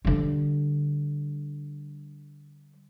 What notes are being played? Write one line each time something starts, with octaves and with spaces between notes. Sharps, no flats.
D3 G3